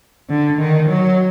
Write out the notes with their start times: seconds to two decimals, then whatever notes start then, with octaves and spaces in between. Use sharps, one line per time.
0.29 D3
0.59 D#3
0.88 F#3